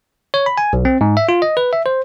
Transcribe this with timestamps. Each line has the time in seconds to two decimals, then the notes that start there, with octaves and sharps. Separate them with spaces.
0.34 C#5
0.46 B5
0.58 G#5
0.73 B1
0.85 C4
1.01 G#2
1.17 E5
1.29 F4
1.42 D#5
1.57 B4
1.73 E5
1.86 C5